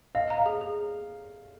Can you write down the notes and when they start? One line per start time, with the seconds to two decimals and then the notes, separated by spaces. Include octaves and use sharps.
0.15 D#5 F5
0.30 A#5
0.38 F5
0.46 G#4
0.61 G#4